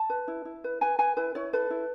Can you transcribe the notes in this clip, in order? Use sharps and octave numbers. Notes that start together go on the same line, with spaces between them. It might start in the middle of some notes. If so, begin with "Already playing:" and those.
Already playing: A5
B4
E4
E4
B4
B4 G#5
B4 G#5
E4 B4
E4 C#5
A4 B4
E4